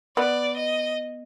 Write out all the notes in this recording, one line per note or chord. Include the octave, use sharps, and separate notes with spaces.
B3 D5
D#5